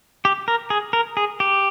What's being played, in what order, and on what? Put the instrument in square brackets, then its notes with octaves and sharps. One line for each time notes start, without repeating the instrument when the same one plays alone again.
[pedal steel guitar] G4
A#4
G#4
A#4
G#4
G4